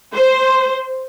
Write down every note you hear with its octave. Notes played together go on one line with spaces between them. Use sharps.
C5